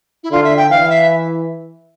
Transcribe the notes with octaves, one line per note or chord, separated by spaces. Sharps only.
E4
D3 F4
E5
G5
E3 F5
E5